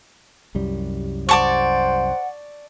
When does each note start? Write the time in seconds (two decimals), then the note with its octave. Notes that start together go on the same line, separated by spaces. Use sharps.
0.55 C2 F#2 G3
1.29 C5 D5 F#5 A5 C#6